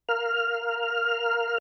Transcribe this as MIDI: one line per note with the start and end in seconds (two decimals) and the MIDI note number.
0.09 1.58 70
0.09 1.58 77
0.09 1.58 89